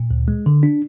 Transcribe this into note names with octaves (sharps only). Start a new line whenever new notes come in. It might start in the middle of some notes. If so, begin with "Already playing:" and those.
Already playing: A#2
D2
G#3
D3
D4